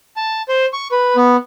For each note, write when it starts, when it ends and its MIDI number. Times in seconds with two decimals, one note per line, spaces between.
0.16 0.42 81
0.49 0.66 72
0.73 0.88 85
0.92 1.16 71
1.16 1.37 59